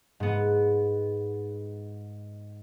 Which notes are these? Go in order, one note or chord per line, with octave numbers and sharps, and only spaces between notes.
G#2 B3